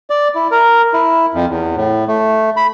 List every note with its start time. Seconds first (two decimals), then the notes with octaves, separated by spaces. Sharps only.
0.10 D5
0.35 E4
0.51 A#4
0.94 E4
1.34 F2
1.50 E2
1.76 A2
2.08 A3
2.57 B5